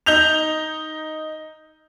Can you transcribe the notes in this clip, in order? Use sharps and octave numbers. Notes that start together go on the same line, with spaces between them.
D#4 G6 F7